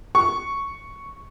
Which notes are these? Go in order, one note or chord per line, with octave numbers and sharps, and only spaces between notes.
C#6